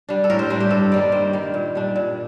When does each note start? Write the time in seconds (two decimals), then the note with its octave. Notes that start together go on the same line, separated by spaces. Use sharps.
0.09 G3 D4
0.24 A4
0.30 A2 A#4
0.39 C5
0.50 G3 D4 C5
0.60 G4
0.70 G2 A4
0.92 D#3 G3 A#3 D5
1.12 G2 C5
1.33 D#3 G3 A#3
1.54 A#2
1.75 G3 D4
1.96 A#2